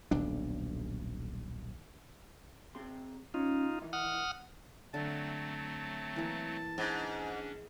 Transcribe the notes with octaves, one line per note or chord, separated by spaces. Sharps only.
D#1 B1 D4
C4 G#4 C6
C#4 D#4 F4
D#3 E3
F#5 D#6 F6
D3 F#3 A3 C4 A5
E3 A#3
G#2 C#4 D4